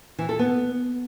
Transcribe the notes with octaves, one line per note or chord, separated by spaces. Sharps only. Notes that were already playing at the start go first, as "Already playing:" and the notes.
E3
A4
B3